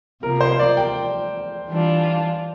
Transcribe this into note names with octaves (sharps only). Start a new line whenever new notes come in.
C3 F3 A#3 A#4
C5
D5
G5
E3 G3 D4 F4